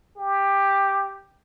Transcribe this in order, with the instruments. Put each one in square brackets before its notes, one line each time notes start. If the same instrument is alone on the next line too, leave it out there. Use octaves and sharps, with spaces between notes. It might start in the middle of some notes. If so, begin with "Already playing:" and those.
[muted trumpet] G4